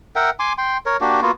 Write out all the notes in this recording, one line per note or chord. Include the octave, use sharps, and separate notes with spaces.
A#4 E5 F#5 G5
G#5 C6 D6
G5 C6
A#4 C#5
A#3 D4 F#4 G4
A#3 B3 F4 F#4